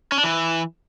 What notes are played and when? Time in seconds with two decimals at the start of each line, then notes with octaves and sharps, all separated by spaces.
0.12 C#4
0.18 D4
0.24 E3